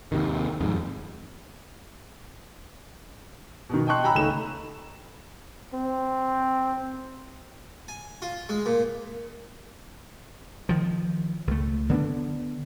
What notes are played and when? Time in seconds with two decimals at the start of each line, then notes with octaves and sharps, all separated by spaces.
0.12 D#2 C3 D#3
0.61 F2 G#2
3.70 B2 D#3
3.87 D#5 G5 A5 C6 C#6 F#6
4.04 G5 G#5 A#5 B5 E6
4.15 C#2 A3 D#4 E7
5.74 C4
7.88 G#5
8.22 F4
8.49 G#3
8.66 A#2
10.69 D#3 F3
11.47 C#2 A3
11.89 D3 B3 D4